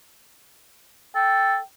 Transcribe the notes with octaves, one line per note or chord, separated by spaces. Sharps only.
A4 G5